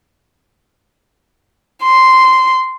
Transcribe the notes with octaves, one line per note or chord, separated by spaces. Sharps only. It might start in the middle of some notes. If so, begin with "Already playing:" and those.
C6